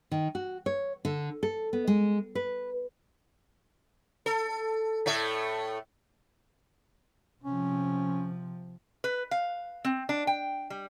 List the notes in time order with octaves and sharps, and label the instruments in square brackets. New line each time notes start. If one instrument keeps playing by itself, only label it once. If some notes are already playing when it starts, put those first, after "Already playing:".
[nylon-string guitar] D#3
F#4
C#5
D3
A4
B3
G#3
B4
[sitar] A4
A2 A3 E5
[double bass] C3 F3 [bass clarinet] C#4
[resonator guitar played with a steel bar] B4
F5
C4
D4
G5
G3